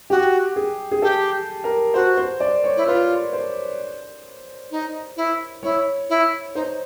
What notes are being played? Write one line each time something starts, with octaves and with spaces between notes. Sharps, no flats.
F#4 G4
G#4
G#4
G4 A4
A#4
F#4 C5
C5
D5
C#5
E4
F4 B4
C5
D#4
E4
E4 C#5
E4
D#4 C5